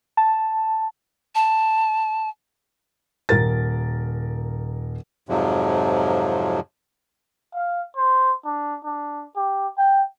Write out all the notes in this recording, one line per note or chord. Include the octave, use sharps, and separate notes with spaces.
A5
A5
D#1 A#4 A6
F2 G#2 C3 F3 F#3
F5
C5
D4
D4
G4
G5